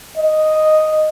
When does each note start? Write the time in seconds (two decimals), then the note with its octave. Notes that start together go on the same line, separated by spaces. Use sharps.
0.17 D#5